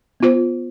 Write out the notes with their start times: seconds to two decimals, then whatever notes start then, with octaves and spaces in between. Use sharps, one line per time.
0.20 B3 F4 C5